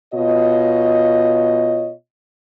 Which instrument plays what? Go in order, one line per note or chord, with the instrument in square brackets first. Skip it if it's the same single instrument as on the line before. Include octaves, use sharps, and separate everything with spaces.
[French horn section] B2 F4 C#5 D#5